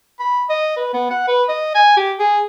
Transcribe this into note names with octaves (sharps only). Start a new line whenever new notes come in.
B5
D#5
B4
B3
F#5
B4
D#5
G#5
G4
G#4